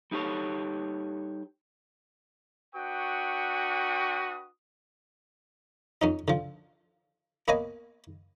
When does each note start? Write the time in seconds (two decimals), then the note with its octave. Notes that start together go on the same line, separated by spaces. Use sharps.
0.11 G3 D#4 G4 A4 C#5
2.74 D4 F#4 B4 G5 C#6 D#6
6.02 F2 C#4 D#4
6.28 D3 F3
7.48 A#3 B3 B4 C#5 D#5 G#5